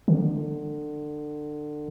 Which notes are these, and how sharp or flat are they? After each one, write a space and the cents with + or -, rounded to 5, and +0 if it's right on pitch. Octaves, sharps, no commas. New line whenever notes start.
D3 +25